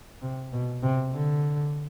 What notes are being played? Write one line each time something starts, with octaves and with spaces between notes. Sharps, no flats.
C3
B2
C3
D3